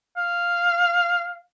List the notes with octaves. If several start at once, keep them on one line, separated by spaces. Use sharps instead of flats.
F5